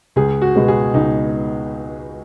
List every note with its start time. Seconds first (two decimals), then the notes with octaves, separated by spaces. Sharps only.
0.16 C#2 G#4
0.42 F#4
0.56 B2 G#3 B3
0.68 G#4
0.94 C#2 D#4